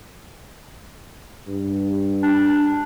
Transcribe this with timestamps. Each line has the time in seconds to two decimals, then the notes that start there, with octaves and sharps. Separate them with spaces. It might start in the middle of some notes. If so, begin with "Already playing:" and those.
1.48 G2
2.23 D4